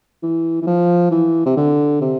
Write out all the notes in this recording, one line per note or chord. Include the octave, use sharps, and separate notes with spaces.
E3
E3
F3
E3
C3
D3
C3